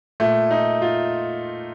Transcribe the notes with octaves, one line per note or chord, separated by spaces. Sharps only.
A#2 A3
D#4
F4